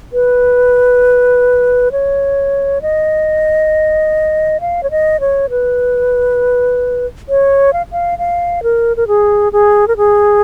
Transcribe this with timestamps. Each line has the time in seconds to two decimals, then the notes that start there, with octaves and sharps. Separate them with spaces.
0.13 B4
1.92 C#5
2.82 D#5
4.61 F5
4.83 C#5
4.91 D#5
5.20 C#5
5.50 B4
7.29 C#5
7.73 F5
7.92 F5
8.19 F5
8.63 A#4
8.97 A#4
9.08 G#4
9.53 G#4
9.88 A#4
9.97 G#4